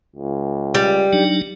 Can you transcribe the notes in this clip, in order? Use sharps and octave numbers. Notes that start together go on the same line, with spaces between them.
C#2
G3
F#3 D4 D#4